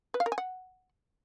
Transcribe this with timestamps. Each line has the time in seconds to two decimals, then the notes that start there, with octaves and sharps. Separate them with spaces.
0.14 B4
0.20 F5
0.26 A#4
0.32 G#5
0.38 F#5